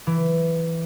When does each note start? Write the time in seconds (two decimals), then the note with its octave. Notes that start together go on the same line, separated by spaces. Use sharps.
0.07 E3